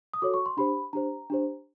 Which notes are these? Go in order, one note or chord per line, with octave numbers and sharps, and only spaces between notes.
D#6
F#4 A4 C#5 D6
C#6
C6
D4 G4 C5 B5
D4 G4 C5 A#5
D4 G4 C5